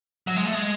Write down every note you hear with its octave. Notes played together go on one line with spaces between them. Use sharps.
F#3
G#3
A3
G#3